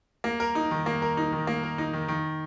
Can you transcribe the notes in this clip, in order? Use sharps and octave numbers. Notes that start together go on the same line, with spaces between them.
A#3
A#4
D#4
D#3
A#3
A#4
D#4
D#3
A#3
A#4
D#4
D#3
D#3